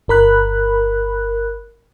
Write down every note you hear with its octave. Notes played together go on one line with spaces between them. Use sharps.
G1 A#4 B5 F#6